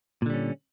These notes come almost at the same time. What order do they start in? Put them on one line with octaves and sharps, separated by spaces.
A#2 D3 G3 C#4